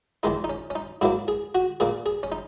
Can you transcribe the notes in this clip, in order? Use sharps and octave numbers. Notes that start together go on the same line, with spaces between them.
E2 D#3 G#3 D#4
D#4
C#4
C#4
D#4
G#2 F#3 A#3 E4
G#4
F#4
A#2 A#3 G#4
G#4
C#4
D#4